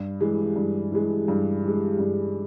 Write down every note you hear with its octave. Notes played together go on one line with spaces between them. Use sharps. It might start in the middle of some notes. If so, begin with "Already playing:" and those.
Already playing: G2
E3 G#3
G2
E3 G#3
G2
E3 G#3
G2